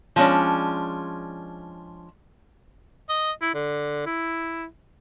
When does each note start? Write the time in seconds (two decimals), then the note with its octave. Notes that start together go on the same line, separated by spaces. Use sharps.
0.16 F3 G#3 C#4 D4
3.09 D#5
3.42 E4
3.54 D3
4.06 E4